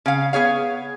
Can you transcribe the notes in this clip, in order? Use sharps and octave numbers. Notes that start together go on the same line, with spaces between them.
C#3 F5
B3 G#4 C#5 F5